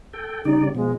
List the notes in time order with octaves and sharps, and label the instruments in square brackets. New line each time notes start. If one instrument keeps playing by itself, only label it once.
[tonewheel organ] A4 G5
[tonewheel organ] C#3 G3 D5 [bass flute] D#4
[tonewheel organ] B2 F3 [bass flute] G#3